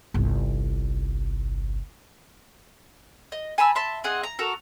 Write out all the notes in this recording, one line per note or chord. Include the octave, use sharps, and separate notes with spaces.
G1 C2
D#5
G#5 A5 B5 E6
E5 A5 C6
C4 G#4 D#5 F#5
A#5
F#4 A4 A#4